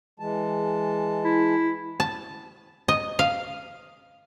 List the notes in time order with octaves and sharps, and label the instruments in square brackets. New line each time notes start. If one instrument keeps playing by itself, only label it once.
[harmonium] E3 G#3 A5
[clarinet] E4
[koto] A5
D#5
F5